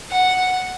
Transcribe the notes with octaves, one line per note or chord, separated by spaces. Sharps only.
F#5